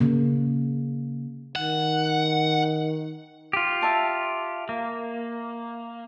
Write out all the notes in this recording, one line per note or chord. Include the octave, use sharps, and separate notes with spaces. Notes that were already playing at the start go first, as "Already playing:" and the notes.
C#3 A#3
D#3 F#5
F4 G4
E5 A5 C6
A#3